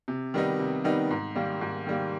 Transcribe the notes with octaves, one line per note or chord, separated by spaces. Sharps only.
C3
D#3 G3 B3 D#4
C3
D#3 G3 B3 D#4
G#2
D#3 G3 A#3
G#2
D#3 G3 A#3